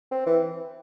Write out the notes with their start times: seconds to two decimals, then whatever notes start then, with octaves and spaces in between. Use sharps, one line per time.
0.12 C4
0.26 E3